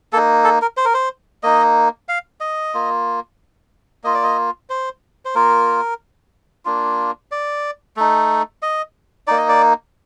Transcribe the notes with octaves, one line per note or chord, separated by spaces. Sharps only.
A#3 D#4 A4
A4
A#4
C5
A#4
C5
A#3 D#4 D#5
F5
D#5
A#3 F4
A#3 F4 D#5
D5
D#5
C5
C5
A#3 F4 A#4
A#3 D4 F4
D5
A3 D#4
D#5
A#3 D#4 D5
D#5
D5